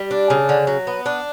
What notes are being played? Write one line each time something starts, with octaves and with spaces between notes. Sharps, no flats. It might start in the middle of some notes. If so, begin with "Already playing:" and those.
Already playing: G3
D4
C#3
D3
F#3
B3
D4